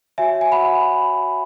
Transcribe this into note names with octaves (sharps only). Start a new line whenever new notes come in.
F#4 C#5 E5 G#5
G#5
F#5 B5